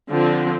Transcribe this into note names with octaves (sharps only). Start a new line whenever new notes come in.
D3 F3 C4